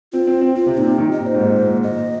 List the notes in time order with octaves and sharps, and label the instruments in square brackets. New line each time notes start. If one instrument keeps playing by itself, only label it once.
[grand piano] C4 [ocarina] F4
[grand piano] C4
C4
[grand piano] C4 [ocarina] F4
[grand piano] C3
[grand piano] A#2 [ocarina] D#4
[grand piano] C3
D#3
[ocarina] D#5
[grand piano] A#2
[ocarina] C5
[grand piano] G#2
A#2
A#2
[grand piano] A#2 [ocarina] D#5